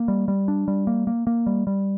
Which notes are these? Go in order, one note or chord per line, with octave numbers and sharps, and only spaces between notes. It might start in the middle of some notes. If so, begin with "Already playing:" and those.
Already playing: A#3
G3
G3
D4
G3
A#3
A#3
A#3
G3
G3